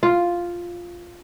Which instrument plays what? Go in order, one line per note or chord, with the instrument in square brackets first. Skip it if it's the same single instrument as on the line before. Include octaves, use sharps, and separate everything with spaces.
[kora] F4